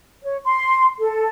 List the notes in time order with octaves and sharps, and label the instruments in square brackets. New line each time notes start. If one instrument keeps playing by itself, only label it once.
[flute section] C#5
C6
A4